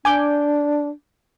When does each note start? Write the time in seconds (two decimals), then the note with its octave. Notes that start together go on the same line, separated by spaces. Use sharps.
0.05 D4 G#5 D6 G6